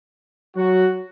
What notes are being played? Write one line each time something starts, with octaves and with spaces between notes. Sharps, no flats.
F#3 F#4